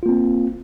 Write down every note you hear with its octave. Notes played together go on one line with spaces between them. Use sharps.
A#3 C4 F4